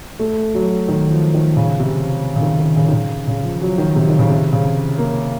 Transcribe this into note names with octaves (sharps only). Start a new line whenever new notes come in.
A3
F#3
D#3
F3
D#3
C#3
C3
C#3
D#3
D#3
C#3
D#3
C#3
C#3
F3
F#3
D#3
C3
D#3
C#3
C3
C#3
A#3